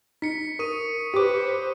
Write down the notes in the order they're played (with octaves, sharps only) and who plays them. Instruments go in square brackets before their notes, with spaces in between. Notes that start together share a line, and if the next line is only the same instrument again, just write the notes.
[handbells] D#4 [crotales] B6 C#7
[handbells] A#4 [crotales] C#6 D#6 D#7
[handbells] G4 D6 [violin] B4 C5